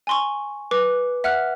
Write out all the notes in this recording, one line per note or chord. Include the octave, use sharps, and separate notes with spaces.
G#5 C6 C#6
B4 D6
E5 F#5 F6 F#6